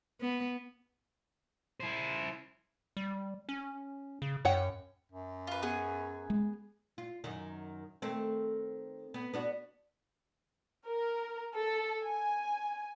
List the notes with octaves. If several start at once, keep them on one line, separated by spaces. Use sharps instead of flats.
B3
E4 C5
G3
C#4
C#3
F#2 C#5 F#5 G5
F#2
F4 B4
B3 G#4
G#3
F4
F#2 D#3
D#3 A3 C4
B3
B3 D4 F#4
A#4
A4
G#5